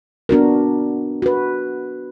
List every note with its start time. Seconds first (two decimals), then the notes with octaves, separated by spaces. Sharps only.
0.29 B3 D4 F#4 A#4
1.22 F#4 B4